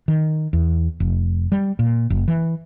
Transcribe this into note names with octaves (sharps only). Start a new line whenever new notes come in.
D#3
E2
F1
G3
A#2
F#1
E3